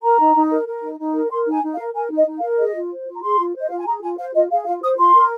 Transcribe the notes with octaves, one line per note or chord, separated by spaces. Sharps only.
A#4 A#5
D#4
D#4
A#4
A#4
D#4
D#4
A#4
A#4 C6
D#4
G#5
D#4
F5
A#4
A#4 G#5
D#4
D#5
D#4
F5
A#4
G#4 D#5
F4
C5
F4
A#5
G#4 C6
F4
C5
D#5
F4 F5
G#5
G#4 A#5
F4 G#5
C5 F5
F4 D#5
G#4 F5
F4 F5
C5 D#6
F4 C6
A#4